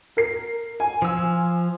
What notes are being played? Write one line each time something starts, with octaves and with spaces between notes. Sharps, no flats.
A#4 C7
G#5
F3 E6